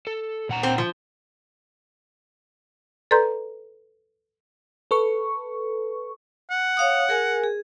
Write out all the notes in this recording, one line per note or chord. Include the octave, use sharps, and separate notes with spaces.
A4
A#2 F#5 A#5
C4
F3
A4 B4 D5 A#5 C6 G6
A4 B4 C#6
F#5
C#5 F5 D#6
G#4 A#4 G#5
G#4